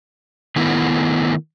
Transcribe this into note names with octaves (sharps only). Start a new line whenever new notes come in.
D#3 A3 B3 E4